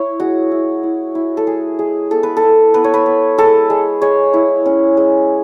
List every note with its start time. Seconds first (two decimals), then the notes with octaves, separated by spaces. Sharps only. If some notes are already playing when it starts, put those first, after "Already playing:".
Already playing: E4 C#5
0.20 G#3 F#4
0.51 E4
0.83 E4
1.15 E4
1.37 A4
1.47 G#3 G#4
1.79 G#3 G#4
2.11 B3 A4
2.23 B4
2.37 A4
2.43 E4
2.74 B3 B4
2.84 C#5
2.94 B4
3.06 B3
3.38 G#3 A4
3.70 G#3
4.02 G#3 C#5
4.34 E4
4.66 C#4
4.97 G#3